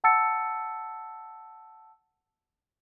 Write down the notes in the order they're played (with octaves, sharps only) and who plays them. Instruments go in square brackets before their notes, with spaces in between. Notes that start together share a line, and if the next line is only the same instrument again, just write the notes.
[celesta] F#5 A5 E6 A6 C#7